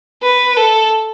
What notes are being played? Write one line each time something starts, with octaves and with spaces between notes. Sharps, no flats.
B4
A4